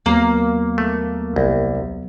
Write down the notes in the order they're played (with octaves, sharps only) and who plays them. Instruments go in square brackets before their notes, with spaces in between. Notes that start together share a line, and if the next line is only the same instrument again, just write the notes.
[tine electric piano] D#2 F#3 B3 [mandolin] A#3
[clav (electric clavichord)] A3
C2